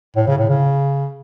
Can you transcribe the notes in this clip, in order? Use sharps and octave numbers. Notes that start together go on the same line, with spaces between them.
A2
C#3
A2
C#3